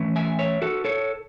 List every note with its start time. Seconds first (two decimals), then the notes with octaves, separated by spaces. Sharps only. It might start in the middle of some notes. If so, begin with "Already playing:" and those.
Already playing: E3 A3 C#4
0.16 E5 G#5
0.39 C#5 E5
0.62 F#4 A4
0.85 A4 C#5